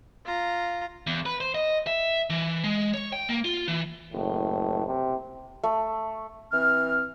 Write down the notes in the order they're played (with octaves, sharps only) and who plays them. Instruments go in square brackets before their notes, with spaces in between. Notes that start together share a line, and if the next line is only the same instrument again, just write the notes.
[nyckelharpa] F4 A#5
[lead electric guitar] E2
B4
C5
D#5
E5
E3
G#3
C#5
G5
A#3
F4
E3
[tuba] F#1 [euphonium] A2
[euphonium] C3
[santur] A3
[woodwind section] E3 C4 F6